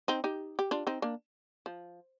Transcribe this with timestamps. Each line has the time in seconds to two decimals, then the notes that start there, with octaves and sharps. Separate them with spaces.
0.08 C4 D#4
0.24 D#4 G4
0.59 G4
0.71 D4 F4
0.87 C4 D#4
1.02 A#3 D4
1.66 F3